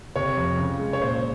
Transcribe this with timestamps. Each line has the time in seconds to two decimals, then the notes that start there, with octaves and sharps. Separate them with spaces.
0.16 C3 C#5
0.37 F2
0.58 C#3
0.79 G#3
0.93 C#5
1.01 A#2 C5